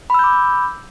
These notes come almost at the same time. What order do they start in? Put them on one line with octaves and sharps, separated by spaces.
B5 E6 G6 D6